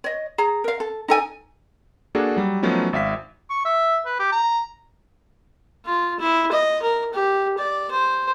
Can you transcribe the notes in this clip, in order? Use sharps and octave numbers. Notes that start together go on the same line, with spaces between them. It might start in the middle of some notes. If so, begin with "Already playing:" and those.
C#5 D#5
G#4 A#5
A#4 F5
A4
D#4 A4 G#5
A#3 D4 F#4 G#4 A4
F#3 G3
F3 F#3 A3 B3 C#4 D#4
G#1 E5 F5 B6
C#6
E5
B4
G4
A#5
F4
E4
D#5
A#4
G4
D5
C5